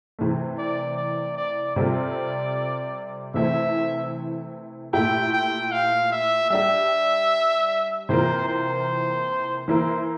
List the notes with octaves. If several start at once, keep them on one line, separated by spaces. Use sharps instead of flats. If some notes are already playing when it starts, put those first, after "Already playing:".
C3 E3 A3
D5
D5
D5
C3 G3 C4 F4 A4 D5
C3 E3 A3 C4 E4 E5
A#2 A3 E4 G4 G5
G5
F5
E5
G3 D4 G4 E5
C3 E3 A#3 F4 A#4 C5
C5
E3 A#3 E4 A#4 C5